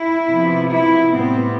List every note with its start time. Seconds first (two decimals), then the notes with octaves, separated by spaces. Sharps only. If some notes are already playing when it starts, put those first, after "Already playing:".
Already playing: E4
0.27 C3 F3 B3
0.69 E4
1.10 A2 G3 B3 C4